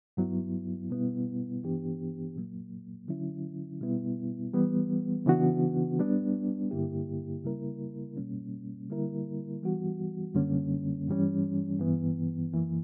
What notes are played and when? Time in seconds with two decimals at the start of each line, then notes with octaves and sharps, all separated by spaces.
0.17 G2 F#3 B3 E4
0.90 B2 G3 B3 E4
1.63 G2 E3 B3 D4 G4
2.35 A#2 F#3 A#3
3.08 D3 F#3 C#4 E4
3.81 B2 G3 B3 E4
4.54 E3 G3 B3
5.26 C#3 E3 B3 D4 F#4
5.99 G3 B3 D4
6.71 G2 D3 A#3 E4 G4
7.44 C#3 G3 A#3 E4 A#4
8.17 B2 G3 A#3 C#4
8.90 D3 G3 A#3 E4 A#4
9.63 E3 G3 B3 F#4
10.34 F#2 D3 G3 A#3 C#4
11.08 G2 E3 G3 C#4
11.80 G2 E3 B3
12.53 F#2 E3 A#3